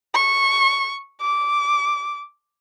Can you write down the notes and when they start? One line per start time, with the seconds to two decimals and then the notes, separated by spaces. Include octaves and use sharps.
0.14 C#6
1.21 D6